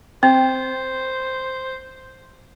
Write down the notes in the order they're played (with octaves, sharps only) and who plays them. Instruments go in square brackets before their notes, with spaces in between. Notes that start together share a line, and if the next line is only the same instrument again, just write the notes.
[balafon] C4 [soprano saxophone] C5